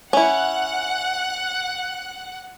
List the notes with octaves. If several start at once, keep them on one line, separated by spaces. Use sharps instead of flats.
C#4 E4 F#5 F#6